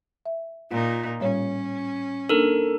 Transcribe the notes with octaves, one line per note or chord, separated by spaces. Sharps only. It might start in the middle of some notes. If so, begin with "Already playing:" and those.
E5
A#2 D#4 F4
A2 G3 C#4 C#5
A#3 D4 D#4 A4 A#4